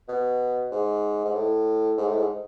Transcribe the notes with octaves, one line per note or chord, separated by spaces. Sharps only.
B2
G#2
G#2
A2
G#2
A2
G#2